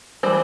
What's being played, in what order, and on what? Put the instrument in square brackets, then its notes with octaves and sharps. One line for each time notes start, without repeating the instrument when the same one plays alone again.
[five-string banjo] E3 G3 C4 C5